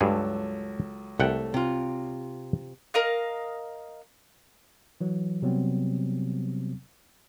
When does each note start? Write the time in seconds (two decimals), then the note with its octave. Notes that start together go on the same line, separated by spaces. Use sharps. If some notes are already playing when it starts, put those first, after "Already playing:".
0.01 C#2 G2 F#3 G#4 A4
1.20 C2 A3 F#5 G5
1.54 C3 F4
2.94 A#4 D#5 F5
5.01 E3 F#3
5.42 C3 F#3 G3 B3 C4